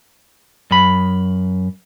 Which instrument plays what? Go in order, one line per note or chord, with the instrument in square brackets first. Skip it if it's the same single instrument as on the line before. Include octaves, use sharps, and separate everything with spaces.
[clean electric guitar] F#2 B5